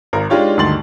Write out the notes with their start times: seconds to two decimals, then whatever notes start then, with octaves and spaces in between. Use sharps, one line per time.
0.13 G#1 A#4
0.30 G#3 D4 D#4 F4 G4 C#5
0.57 D2 G2 D#3 C6 A6 F#7